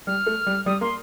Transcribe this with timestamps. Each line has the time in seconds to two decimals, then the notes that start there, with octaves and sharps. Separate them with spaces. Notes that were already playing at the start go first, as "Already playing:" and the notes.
0.07 G3 F6
0.27 A3
0.46 G3
0.66 G3 D#6
0.81 A#3 C6